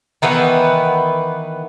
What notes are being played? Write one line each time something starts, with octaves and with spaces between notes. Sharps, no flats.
D#3 E3 B3 B4